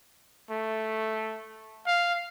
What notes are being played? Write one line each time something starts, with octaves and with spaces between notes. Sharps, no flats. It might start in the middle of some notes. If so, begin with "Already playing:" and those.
A3
F5